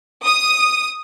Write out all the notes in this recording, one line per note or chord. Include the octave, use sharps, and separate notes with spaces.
D#6